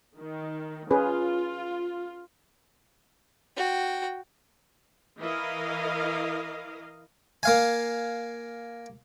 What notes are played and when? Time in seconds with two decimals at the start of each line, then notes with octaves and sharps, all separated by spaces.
0.17 D#3
0.91 C#4 F4 G#4 B4
3.56 F#4 G5
5.19 E3 E4 A#4 D#5 F5
7.43 A#3 F5 G#5